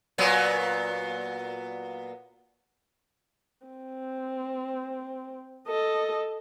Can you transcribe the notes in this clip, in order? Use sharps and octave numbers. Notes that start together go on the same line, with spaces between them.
A#2 F#3 B3
C4
A4 D#5